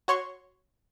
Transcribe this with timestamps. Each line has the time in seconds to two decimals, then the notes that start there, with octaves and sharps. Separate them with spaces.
0.08 F#4 C#5 C6 C#6